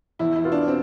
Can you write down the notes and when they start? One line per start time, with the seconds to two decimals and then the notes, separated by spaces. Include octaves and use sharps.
0.19 E2 E4
0.36 E4
0.44 B2 B3 F4
0.52 D4
0.68 C4